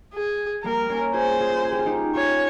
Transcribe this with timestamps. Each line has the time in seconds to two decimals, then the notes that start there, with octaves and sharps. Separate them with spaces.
0.14 G#4
0.63 G3 A#3 A#4
0.89 A#3 C#4
1.14 F4 G#4 C5
1.40 F4 G#4
1.64 G#4
1.72 G4
1.78 F4
1.86 D#4 G4
2.15 C#4 F4 C#5